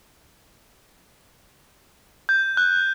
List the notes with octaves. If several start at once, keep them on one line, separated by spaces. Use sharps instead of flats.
G6
F#6